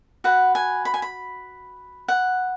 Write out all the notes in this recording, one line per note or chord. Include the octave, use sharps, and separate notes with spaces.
F#4 B4 F#5
G#5
B5
G#5
B5
F#5